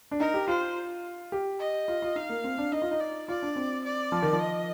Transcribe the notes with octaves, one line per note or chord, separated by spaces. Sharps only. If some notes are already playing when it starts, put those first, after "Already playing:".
D4
D#4 A#4
G4
F4 C5
G4
D#5
F4
F4
D#4 F5
A#3
C4
D4
D#4 D#5
F4
D#4
D5
F4 D5
D4
C4
D5
F3
D#3
F3
D#5